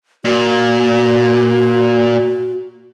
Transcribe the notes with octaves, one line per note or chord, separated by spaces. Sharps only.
A#2 F#4